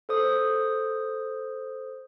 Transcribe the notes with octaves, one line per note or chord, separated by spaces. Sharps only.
A4 C5 D#6